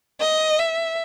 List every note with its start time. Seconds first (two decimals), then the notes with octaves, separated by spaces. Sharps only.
0.21 D#5
0.59 E5